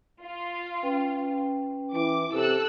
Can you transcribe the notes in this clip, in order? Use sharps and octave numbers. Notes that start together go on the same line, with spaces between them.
F4
C#4 B4 G5
E3 D6
C3 A4 E6 F#6